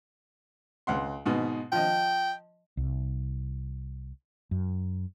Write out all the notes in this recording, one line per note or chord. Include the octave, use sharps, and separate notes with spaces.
C#2 F#5 C6
G#2 B2
F3 D#5 G5
C2
F#2